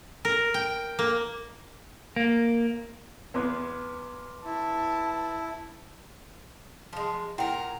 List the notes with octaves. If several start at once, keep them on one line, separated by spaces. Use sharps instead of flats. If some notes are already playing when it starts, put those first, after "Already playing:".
A#4
G5
A#3
A#3
E2 B3 B4 C6 D6
E4 A5
F3 G#3
A#2 E4 A#4 F#5 G5